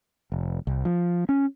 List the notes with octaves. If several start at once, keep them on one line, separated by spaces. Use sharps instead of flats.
F1
C2
F3
C#4